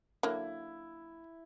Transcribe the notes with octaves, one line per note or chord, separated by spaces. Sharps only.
D3 F#3 A#3 E4